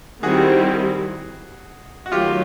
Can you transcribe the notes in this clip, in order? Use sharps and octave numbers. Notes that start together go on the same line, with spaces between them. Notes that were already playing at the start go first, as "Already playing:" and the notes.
D#3 G3 C4 E4 F#4 G#4
F#4
D#3 F#3 A3 F4 G4